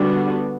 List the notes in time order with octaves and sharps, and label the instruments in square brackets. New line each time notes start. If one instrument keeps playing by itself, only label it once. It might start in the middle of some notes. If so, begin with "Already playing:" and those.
Already playing: [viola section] D3 G3 B3 D4 F#4